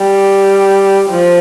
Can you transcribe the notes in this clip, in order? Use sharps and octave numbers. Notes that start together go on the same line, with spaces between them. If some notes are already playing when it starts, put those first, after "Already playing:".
Already playing: G3
F3